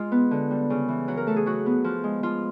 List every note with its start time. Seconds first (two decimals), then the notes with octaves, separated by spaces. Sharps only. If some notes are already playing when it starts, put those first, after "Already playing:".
Already playing: G#3 F4
0.12 B3
0.31 D3
0.51 G3
0.70 C#3
0.88 E3
1.08 F#3 F#4
1.17 A#4
1.27 A3 A4
1.36 G#4
1.46 F#3 F#4
1.66 B3
1.84 F3
2.04 G#3
2.23 F3 F4